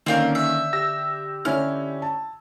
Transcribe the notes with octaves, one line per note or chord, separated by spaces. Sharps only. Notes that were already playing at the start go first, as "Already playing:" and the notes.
D3 D#3 A#3 C4 C#4 F4 A#4 G6
E5
G4 E6 A#6
D3 C#4 E4 F6
A5